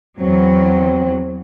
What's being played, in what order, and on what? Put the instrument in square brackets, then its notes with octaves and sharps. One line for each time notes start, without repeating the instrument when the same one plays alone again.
[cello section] E2 F#3 [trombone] C4